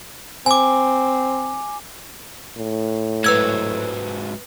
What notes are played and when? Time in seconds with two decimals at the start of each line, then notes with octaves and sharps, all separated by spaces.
0.46 C4 G#5 D6
2.58 A2
3.24 G#2 F#3 B4 E6 G#6